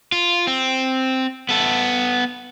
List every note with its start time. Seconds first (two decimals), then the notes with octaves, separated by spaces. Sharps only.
0.12 F4
0.47 C4
1.49 B3 A4